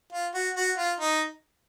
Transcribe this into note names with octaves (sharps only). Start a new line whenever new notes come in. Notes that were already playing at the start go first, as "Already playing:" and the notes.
F4
F#4
F#4
F4
D#4